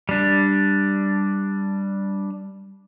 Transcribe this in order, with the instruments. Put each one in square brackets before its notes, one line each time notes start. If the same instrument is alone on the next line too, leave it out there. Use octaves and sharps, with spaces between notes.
[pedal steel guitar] G3 D4